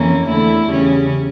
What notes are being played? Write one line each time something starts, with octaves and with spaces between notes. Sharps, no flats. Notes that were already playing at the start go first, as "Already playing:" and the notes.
Already playing: F2 E3 A#3 C#4
E2 D3 A3 E4
E2 C#3 G3 C#4